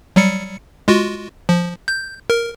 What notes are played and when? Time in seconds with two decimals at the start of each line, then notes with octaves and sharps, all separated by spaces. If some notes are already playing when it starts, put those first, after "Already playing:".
0.16 F#3 G3 C#7
0.88 G#3 F4 F#4
1.49 F3
1.88 G6
2.30 A#4